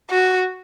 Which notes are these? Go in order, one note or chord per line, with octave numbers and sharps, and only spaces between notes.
F#4